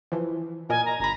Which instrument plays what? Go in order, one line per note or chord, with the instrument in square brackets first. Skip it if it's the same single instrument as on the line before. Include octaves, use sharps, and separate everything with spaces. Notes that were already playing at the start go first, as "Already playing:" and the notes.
[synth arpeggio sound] E3 F3
[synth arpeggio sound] A#2 A#4 D#5 [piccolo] G#5
[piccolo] A#5
[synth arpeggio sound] G1 B5 [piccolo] A#5